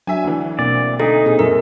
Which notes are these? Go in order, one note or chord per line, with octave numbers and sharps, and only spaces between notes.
F#3 D4 E5 G#5
D2 E3
B2 A#3 C4 D5
D2 D#4 A4
A#2 C4 G#4
F#2 A#4